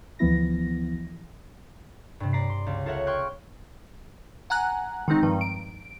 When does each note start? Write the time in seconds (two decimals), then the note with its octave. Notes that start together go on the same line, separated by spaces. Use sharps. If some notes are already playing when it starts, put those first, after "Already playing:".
0.19 D2 E3 F3 B3 E4 A#6
2.20 G2 C3
2.33 D5 A#5 B6 C7
2.50 C6
2.66 C#2
2.86 F4 A4 A#4 C#5 E5 F#5
3.07 G5 C6 C#6 F6 F#6 G#6
4.50 F#5 G#5 A#5 F#6
5.08 D#3 G#3 C4 D#4
5.23 G2 D#3 F3
5.41 D7